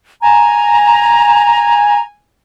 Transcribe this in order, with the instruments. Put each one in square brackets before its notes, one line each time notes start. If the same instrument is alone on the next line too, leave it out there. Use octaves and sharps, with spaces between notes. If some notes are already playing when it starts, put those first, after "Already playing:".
[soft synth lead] G#5 [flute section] A#5